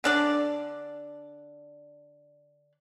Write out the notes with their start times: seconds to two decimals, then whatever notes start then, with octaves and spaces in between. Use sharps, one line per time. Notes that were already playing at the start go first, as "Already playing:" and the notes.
0.04 D3 D4 D5